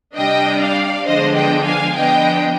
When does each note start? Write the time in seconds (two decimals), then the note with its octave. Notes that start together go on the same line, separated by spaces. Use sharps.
0.16 C3 G3 D4 D#5 G5
0.61 D5 F5
1.06 D3 F3 G#3 B3 D4 C5 D#5
1.36 D#5 G5
1.65 F5 G#5
1.95 F3 B3 D4 D#5 G5